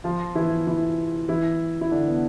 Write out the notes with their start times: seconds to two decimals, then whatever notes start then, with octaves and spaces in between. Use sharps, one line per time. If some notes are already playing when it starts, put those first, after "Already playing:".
0.04 F3 F4
0.35 E3 E4
0.67 E3 E4
1.29 E3 E4
1.81 E4
1.91 D3 D4
2.07 B3